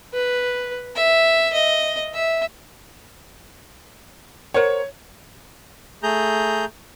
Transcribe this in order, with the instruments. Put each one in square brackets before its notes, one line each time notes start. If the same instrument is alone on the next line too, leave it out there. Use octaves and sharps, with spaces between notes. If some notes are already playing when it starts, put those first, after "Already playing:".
[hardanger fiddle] B4
E5
D#5
E5
[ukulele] A#4 C5 F#5 [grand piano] C#5
[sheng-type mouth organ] A3 G#4 A#5 G6